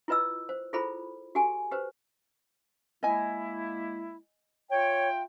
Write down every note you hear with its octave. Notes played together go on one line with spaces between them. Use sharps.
E4 F4 B4 D#5 E6
C5
E4 F4 G#4 A4 C5 B5
F#4 G4 A4 G#5
G4 B4 C5
G#3 A#3 E4 D#5 G#5
F4 C#5 E5 G5